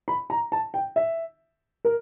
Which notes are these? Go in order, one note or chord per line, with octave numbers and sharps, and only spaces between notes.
B5
A#5
A5
G5
E5
A#4